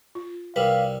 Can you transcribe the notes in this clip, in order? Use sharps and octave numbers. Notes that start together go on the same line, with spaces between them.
F4
C2 G3 A#4 B4 F5